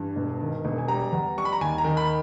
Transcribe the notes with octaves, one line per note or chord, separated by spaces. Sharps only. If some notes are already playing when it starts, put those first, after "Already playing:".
Already playing: G2 E3
E1
D#3
E1
G#5
G3 A#5
E2
G3 C#6
B5
A#5
D#2 G#5
A#5
D#3
B5